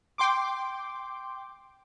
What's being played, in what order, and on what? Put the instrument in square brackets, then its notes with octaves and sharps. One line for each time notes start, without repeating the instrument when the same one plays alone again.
[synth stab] G5 C6 D6